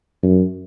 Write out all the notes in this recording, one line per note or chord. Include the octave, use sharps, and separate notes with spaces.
F#2